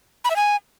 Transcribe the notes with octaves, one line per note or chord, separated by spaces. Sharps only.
B5
E5
G#5